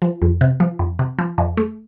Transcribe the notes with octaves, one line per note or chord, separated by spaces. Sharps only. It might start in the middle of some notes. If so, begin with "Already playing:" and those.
F3
F2
C3
F3
F2
C3
F3
F2
A3